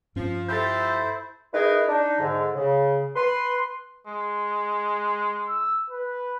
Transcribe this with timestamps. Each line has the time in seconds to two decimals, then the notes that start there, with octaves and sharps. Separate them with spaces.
0.16 G2 F3 C#4
0.49 F3 E4 G4 A4 C5 G6 A6
1.54 D#4 E4 G#4 A#4 B4
1.89 D4 D#4
2.20 G#2 D3
2.55 C#3
3.16 B4 C6
4.07 G#3
5.49 E6
5.90 B4